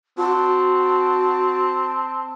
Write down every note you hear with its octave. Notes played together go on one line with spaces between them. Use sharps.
C4 F#4 A5